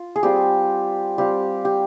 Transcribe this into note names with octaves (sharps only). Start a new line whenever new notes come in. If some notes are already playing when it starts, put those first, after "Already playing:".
Already playing: F4
G#4
G3 C4 F4 G4
G3 C4 F4 G4
G4